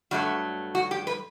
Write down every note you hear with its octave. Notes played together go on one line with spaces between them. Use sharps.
G2 F#3 A3 F#4
F#4
G4
B4